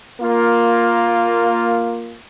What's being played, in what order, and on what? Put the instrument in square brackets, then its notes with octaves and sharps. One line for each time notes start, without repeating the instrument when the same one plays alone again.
[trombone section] A#3 F4